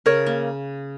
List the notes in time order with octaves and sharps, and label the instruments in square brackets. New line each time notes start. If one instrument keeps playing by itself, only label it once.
[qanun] C#3 [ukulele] A#4 C#5
[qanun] A#3